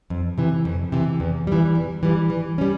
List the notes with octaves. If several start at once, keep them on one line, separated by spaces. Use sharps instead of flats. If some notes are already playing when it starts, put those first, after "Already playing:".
F2
C3 E3
F2
C3 E3
E2
E3 G3
E2
E3 G3
E3
G3 C#4